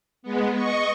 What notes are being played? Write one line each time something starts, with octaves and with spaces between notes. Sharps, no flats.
G#3 B3
D#5 C#6